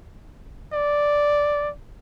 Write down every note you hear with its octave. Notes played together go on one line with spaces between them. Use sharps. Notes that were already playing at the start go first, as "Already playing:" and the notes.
D5